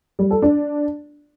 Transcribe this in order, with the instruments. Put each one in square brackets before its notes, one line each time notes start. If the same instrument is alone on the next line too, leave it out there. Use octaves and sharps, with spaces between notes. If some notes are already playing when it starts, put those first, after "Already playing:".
[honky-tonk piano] G3
A4
D4